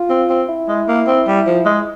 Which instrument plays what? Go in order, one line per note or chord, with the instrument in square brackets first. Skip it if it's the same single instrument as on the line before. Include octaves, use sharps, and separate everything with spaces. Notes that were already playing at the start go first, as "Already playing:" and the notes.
Already playing: [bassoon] F4
[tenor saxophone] C4
C4
[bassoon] E4
[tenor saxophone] G#3
A#3
C4
G3
F3
G#3